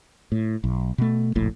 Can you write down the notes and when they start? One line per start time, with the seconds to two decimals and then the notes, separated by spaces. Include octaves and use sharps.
0.32 A2
0.64 B1
0.98 B2 A3
1.35 F1 A#1 A2